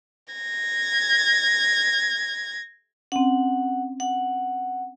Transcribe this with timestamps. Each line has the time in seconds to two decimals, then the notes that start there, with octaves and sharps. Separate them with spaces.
0.34 G#6 A#6
3.12 C4 C#4 F#5
4.00 F#5